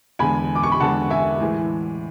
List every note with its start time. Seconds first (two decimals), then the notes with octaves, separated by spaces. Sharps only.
0.19 E2 D3 G#3 G#5 B5
0.55 D6
0.63 C#6
0.72 B5
0.80 E2 D3 G#3 F#5 A5
1.11 E5 G#5
1.40 A2 E3 G#3